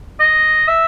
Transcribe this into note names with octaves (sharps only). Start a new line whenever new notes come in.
D#5
E5